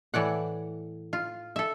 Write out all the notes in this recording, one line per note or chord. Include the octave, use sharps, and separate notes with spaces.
A2 E3 D5 F#5
F4
A4 E5